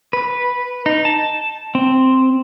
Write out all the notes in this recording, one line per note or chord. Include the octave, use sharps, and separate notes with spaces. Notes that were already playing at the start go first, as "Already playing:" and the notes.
B4
D#4
A5
C4